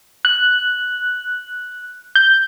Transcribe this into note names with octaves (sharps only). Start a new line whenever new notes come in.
F#6
G6